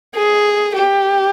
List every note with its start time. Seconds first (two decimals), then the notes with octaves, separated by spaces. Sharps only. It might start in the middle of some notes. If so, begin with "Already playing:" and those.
0.14 G#4
0.75 G4